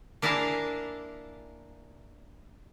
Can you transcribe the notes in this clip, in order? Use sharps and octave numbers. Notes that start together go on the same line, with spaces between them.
A#3 D4 E4 G#4 A#4 F5